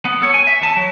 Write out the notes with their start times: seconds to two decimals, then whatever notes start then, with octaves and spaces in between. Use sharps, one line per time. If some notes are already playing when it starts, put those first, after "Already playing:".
0.05 B3
0.22 A4 C#5
0.34 G#5
0.47 E5
0.62 E2 A5
0.77 F#3